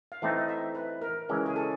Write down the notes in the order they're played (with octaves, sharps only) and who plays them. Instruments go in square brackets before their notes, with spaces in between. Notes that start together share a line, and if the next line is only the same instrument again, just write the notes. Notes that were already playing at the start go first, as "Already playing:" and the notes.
[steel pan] F5
[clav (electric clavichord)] E3 A3 C4 D#4 [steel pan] E5
[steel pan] D#5
E5
B4
A#4
[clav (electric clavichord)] C#3 E3 G#3 C#4 [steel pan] A#4
[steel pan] G#4
A4